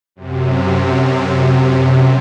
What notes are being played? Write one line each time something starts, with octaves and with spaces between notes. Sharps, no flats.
F#2 C3